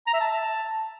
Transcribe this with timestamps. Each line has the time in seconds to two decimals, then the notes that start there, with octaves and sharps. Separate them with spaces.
0.07 A#5
0.14 E5
0.21 A5